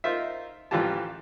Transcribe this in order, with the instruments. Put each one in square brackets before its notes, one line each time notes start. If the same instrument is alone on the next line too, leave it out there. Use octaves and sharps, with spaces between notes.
[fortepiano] D#4 F4 A#4 C5 E5
A1 E3 F3 F4 G4 A5